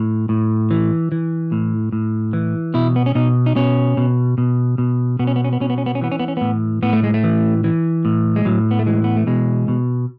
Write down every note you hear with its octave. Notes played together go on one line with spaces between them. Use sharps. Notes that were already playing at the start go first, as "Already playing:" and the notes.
Already playing: A2
A2
E3
E3
A2
A2
E3
B2 E4
B3
C#4
B2 D#4
D#4
B2 C#4
B2
B2
B2
B2 B3
C#4
B3
C#4
B3
B2 C#4
B3
C#4
B3
C#4
E3 B3
C#4
B3
C#4
A2 B3
A2 B3
A3
G#3
A3
E3
E3
A2
G#3
A2 F#3
B3
A3
E3 G#3
B3
A3
B2 G#3
B2